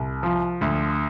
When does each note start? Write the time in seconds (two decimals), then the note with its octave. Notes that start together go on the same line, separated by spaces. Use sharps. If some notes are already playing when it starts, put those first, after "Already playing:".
Already playing: C2
0.23 F3
0.61 D2